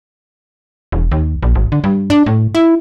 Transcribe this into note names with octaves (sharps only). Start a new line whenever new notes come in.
E1
D#2
A#1
G#1
D3
G2
D4
A2
E4